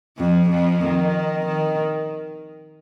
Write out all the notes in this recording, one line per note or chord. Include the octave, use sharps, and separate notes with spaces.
F2 F3
F2 F3
D#3
D#3